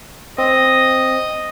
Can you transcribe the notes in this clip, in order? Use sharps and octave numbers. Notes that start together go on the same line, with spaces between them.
C4 D#5